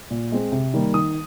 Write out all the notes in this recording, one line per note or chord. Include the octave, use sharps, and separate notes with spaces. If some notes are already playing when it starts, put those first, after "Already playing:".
A#2
G#3 C4
C3
D#3 G3 A#3
D#3 D#6